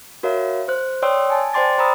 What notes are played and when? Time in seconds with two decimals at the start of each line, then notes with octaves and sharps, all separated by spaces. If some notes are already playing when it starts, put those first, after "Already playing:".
0.23 F#4 A#4 C#5 E5 F5
0.68 C5 F#6
1.02 C#5 D5 G5 C6 D#6 E6
1.30 G#5 A5
1.54 C5 D5 G5 C6 D6 A6
1.78 C5 A#5 B5 D#6 E6